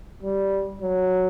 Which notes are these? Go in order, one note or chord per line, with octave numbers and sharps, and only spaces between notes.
G3
F#3